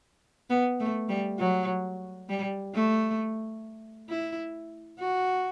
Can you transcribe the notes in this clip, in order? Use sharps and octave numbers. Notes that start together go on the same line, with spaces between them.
B3
A3
G3
F#3
G3
A3
E4
F#4